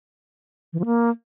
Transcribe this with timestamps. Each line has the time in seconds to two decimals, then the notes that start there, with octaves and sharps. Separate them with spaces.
0.73 E3
0.79 F3
0.86 A#3